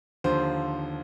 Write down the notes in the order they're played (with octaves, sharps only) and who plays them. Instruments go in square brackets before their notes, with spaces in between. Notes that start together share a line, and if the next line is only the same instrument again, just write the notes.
[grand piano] D#2 D3 F3 C5